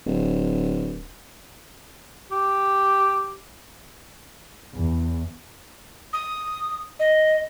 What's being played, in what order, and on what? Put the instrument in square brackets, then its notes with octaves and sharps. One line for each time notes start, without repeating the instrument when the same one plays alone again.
[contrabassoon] D1
[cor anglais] G4
[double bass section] E2
[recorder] D#6
D#5